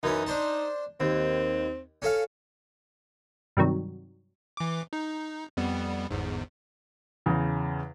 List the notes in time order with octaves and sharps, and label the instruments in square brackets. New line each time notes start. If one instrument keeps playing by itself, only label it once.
[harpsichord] F#2 E3 C#4 [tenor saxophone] D#4
[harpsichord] D4 C5 A5
[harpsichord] D#2 [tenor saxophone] C4
[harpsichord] C#4 A4 F5
[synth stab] G2 C3 D#3 F#3
[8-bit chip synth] E3 D6
D#4
F2 G3 B3
G1 E2 G#2
[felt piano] E2 C#3